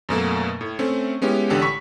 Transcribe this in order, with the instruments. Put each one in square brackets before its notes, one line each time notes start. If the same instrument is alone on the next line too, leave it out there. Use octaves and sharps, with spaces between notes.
[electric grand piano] F#2 B2 A3 A#3
A2
A3 C4 C#4
G#3 B3 C#4 E4 G4
A1 D3 G4 A4
B5 C#6 B6